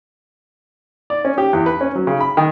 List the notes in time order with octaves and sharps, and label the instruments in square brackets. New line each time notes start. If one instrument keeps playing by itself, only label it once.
[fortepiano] D5
C#4
G4
E2
B4
C#4
F#3
C#3
B5
D#3